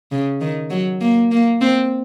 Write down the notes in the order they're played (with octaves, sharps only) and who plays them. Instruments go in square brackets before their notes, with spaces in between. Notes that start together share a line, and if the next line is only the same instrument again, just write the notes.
[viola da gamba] C#3
D#3
F#3
A#3
A#3
C4